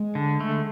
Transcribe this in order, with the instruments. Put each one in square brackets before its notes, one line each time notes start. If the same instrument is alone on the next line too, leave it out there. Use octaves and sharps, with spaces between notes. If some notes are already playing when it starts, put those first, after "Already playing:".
Already playing: [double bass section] G#3
[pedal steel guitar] D3
A3